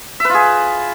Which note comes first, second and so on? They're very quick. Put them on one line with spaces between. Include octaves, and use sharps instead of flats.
E5 B4 F4 G#4